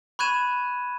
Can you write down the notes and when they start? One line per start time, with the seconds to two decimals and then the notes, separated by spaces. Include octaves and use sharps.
0.19 B5 C#6 F#6 G#6 D#7 E7